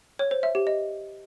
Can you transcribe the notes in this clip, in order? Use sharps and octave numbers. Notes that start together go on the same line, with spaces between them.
C#5
C5
E5
G4
D#5